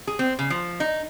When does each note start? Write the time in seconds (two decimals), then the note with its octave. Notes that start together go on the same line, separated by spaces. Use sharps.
0.07 G#4
0.19 C4
0.39 C#3
0.50 F3
0.80 D#4